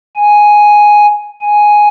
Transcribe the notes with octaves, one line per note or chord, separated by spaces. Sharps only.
G#5
G#5